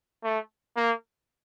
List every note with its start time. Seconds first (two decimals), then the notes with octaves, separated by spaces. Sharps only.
0.24 A3
0.76 A#3